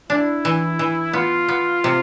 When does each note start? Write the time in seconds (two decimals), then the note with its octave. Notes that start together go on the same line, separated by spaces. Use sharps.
0.10 D4 E4
0.45 E3
0.79 E3
1.13 B3 F4
1.49 B3
1.84 C3